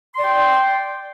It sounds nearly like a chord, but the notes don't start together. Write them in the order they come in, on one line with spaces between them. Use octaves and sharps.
C6 D5 G5